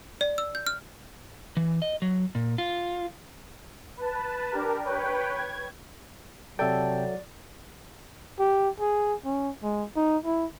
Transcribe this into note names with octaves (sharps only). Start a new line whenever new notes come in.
D5
E6
G6
F6
E3
D#5
F#3
A#2
F4
B4 A5
D4 G4 A#4
B4 C#5 G5
G#6
C3 F#3 A4 D5 E5 G5 A5
G4
G#4
C#4
G#3
D#4
E4